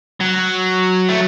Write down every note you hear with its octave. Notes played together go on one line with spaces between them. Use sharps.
F#3
A3